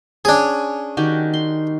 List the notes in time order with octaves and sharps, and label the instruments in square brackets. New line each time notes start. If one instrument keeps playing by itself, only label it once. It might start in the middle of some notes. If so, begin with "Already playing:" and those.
[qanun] C#4 C#5 [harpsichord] D4 G#4
[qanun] D#3 F#4 G4
C6